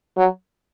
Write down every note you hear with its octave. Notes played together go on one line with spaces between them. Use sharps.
F#3